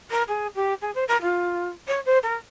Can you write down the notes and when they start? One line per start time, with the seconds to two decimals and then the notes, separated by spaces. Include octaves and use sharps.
0.11 A#4
0.28 G#4
0.55 G4
0.82 G#4
0.95 C5
1.08 A#4
1.22 F4
1.88 C#5
2.06 C5
2.23 A#4